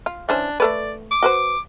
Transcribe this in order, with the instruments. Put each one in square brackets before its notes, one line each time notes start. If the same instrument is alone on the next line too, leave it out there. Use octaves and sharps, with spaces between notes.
[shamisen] F4
[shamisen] E3 C#4 C5 [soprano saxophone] D4
[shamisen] A3 A4 B4 [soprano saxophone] D5
[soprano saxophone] D6
[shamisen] F#4 B4 C5